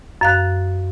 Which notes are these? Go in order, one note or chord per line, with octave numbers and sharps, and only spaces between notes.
F#2 F5 F#6